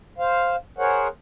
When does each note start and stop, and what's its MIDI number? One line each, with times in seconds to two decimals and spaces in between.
0.18 0.56 72
0.18 0.56 77
0.78 1.08 68
0.78 1.08 70
0.78 1.08 72
0.78 1.08 73
0.78 1.08 78